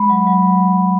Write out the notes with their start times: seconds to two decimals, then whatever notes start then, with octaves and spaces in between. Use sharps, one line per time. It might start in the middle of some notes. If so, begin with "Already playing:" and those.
Already playing: G#3 B5
0.09 F#3
0.27 F#3